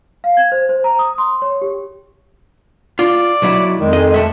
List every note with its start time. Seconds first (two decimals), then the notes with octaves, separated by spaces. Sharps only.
0.24 F5
0.37 G#6
0.52 C5
0.69 C5
0.84 A#5
0.99 D#6
1.18 C6
1.42 C#5
1.62 G4
2.99 F4 D5
3.42 B1 F#3 E4
3.80 F2 D#3 G#3
3.93 G#4 D#5
4.14 D#2 A3 E5